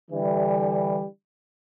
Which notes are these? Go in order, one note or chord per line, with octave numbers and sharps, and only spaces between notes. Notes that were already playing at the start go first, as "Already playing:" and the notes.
D3 E3 G3